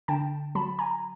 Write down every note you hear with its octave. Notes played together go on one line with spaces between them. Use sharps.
D3 G5 A5
F#3 A5 B5
G#5 A#5